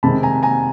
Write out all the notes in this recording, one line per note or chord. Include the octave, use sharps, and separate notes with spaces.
C3 D#3 G#3 A5 B5
G#5 A#5
G#5 A#5